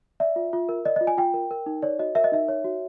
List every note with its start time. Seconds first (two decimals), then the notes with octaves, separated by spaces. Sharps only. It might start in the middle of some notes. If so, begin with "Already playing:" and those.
0.20 D5 E5
0.36 F4
0.53 F4
0.69 A#4
0.85 D5 D#5
0.96 F4 D#5
1.07 G#5
1.17 F4 G5
1.34 A#4
1.51 A#4
1.66 D#4
1.82 C#5 D5
1.99 F#4 D#5
2.15 A#4 E5
2.24 D#5
2.32 D#4 E5
2.48 C#5
2.64 F#4